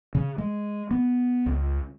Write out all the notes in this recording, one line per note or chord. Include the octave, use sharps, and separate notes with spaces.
C#3
G#3
B3
C#2